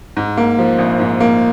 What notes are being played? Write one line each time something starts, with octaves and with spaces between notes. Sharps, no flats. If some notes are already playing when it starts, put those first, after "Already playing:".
G#2
A#3
F3
A#1
G#2
A#3